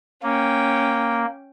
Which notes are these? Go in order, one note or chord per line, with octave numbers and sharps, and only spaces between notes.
A#3 C#4 G5